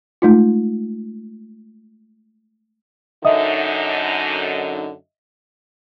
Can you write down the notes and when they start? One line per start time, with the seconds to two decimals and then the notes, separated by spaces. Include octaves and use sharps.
0.22 G#3 A3 D#4 F4
3.25 F#2 D3 D#4 D#5 E5 D#6